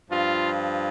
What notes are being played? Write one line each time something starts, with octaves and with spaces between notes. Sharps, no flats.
G2 F3 F4